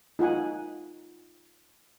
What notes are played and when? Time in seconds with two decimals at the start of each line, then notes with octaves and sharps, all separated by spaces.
0.19 D#4 F4 F#5 G#5